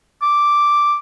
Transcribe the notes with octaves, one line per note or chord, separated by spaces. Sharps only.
D6